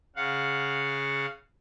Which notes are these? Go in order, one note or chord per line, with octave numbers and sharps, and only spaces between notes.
C#3 F5 F#5